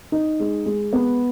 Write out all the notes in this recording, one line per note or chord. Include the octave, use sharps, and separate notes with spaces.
D#4
G#3
G#3
B3